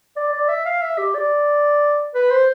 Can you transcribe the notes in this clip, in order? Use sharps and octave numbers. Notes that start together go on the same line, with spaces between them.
D5
D5
E5
F5
E5
G4
D5
B4
C5